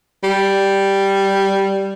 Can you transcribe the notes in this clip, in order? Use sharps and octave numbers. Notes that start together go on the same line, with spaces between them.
G3